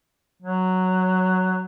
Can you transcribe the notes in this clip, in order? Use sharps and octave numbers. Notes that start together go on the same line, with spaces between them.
F#3